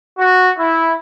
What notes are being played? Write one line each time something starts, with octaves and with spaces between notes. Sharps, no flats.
F#4
E4